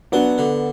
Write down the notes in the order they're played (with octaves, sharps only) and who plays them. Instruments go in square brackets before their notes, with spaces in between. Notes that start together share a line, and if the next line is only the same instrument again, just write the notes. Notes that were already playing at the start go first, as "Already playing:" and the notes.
[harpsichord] F#3 [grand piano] B3 D4
[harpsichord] D3